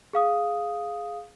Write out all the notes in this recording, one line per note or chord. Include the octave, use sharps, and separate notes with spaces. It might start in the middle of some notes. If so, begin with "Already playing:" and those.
G#4 F5 D#6